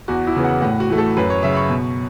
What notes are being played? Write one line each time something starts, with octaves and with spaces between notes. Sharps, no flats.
E2 F#4
E4
C#3 E3 B3
F#5
A2 F#5
F#4
E3 A3
A4
F#2 B4
C#5
C#3 F#3 E5
B5
C#6
B2